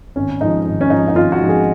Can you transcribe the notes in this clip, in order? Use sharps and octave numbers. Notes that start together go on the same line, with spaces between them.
G#1 C#4
G#2 F3 D#4
G#1
C#4
G#2 F3 D#4
D#4
G#1 F4
F#4
G#2 F3
G#4